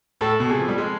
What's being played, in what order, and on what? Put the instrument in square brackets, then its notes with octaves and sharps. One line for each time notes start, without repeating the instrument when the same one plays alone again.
[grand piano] A2 [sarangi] A4
[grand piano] B2
[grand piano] C3 [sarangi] G#4
[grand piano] F3
G3
G#3